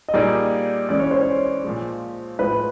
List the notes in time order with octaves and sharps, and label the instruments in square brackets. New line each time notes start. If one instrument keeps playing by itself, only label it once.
[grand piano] D#5
[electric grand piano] A#2 G3 A#3 D#4 G#4 [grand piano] D5
[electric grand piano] E3 G#3 C#4 [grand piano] D5
[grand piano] C#5
C5
C#5
[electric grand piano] A#2 F3 G#3
[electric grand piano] A2 F3 G#3 [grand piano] B4